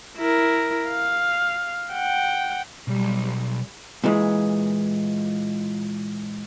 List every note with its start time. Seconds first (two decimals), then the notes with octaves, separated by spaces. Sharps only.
0.17 E4 A#4
0.89 F5
1.92 F#5 G5
2.88 B1 G3
4.04 A#2 E3 G#3